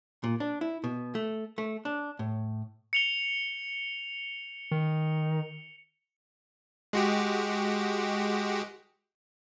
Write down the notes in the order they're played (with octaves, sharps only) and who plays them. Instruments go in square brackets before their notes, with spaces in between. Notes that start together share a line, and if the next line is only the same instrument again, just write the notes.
[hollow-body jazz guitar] A#2
D4
E4
B2
A3
A3
D4
A2
[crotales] C#7 F7 G7
[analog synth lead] D#3
[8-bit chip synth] G#3 F#4 G4